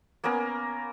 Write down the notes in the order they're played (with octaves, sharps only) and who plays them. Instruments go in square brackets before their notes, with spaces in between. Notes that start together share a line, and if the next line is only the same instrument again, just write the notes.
[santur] A#3 B3 C#4 A#4